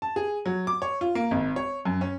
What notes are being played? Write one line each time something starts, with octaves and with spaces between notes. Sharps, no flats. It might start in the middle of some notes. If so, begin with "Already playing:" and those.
A5
G#4
F#3
D6
C#5
F4
A#3
G#1
C#5
F#2
C#4